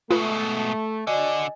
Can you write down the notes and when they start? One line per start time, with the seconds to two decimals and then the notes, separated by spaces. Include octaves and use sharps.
0.11 G#2 B2 A3 F4 B4
1.07 D3 F#4 D5 D#5 G#5